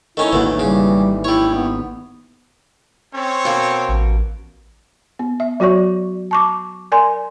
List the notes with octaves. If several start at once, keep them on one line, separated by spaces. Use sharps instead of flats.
D#3 A3 C#4 D#4 E4
G#1 D2 D#3 E3 F#3 A3 A#3
C#3 G3
G3 E4 C#5
B3
C4 C#4 A4 C#5
B2 A#3
A1
B3
E5
F#3 F#4 C#5 D5 C#6
A5 C#6 D6
A#4 D5 G#5 C6